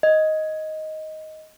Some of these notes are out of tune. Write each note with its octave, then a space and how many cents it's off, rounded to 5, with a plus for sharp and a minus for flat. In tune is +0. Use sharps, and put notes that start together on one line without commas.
D#5 +5